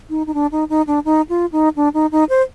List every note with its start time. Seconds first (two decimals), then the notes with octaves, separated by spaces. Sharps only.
0.10 D#4
0.27 D#4
0.34 D4
0.52 D#4
0.69 D#4
0.87 D4
1.05 D#4
1.29 F4
1.52 D#4
1.76 D4
1.94 D#4
2.12 D#4
2.29 C5